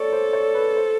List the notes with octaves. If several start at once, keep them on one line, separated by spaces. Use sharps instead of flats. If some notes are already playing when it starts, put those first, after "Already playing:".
Already playing: A4 C#5 D5
C5
C#5
B4
C5